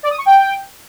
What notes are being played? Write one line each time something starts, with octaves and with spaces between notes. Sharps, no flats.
D5
D#6
C#6
G5